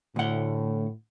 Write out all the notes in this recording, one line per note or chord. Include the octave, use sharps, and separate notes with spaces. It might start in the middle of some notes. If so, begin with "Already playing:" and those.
D2 A2 F#5